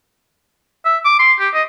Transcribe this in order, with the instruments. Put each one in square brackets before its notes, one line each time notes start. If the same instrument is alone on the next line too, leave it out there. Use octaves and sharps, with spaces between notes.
[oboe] E5
D6
C6
G4
D#5